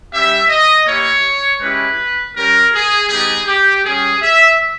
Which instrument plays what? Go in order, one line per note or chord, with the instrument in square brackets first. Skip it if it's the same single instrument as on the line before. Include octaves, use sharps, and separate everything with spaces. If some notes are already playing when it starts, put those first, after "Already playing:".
[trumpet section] G3 C#4 G4 E5
D#5
A#3 E4 G4 C#5
G#3 C#4 E4 G4 B4
G3 C#4 G4 A#4
G#4
G3 B3 D#4 G4 G#4
G4
G3 C#4 G4 G#4
E5